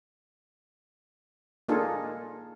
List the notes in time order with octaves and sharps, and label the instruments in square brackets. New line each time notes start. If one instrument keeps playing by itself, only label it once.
[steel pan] A#3 D4 D#4 F4 G#4 A4